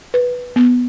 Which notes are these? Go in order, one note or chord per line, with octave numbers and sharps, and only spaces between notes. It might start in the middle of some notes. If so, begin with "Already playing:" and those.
B4
B3